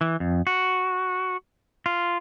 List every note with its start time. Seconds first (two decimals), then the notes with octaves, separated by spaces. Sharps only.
0.01 E3
0.20 F2
0.47 F#4
1.86 F4